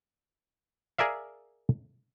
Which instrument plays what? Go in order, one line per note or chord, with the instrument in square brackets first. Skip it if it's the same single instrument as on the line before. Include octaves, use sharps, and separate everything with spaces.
[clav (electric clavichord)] G#4 A#4 D5 E5 F5